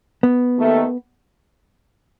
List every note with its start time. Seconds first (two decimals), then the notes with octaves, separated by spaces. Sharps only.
0.23 B3
0.58 D#2 D#3 A3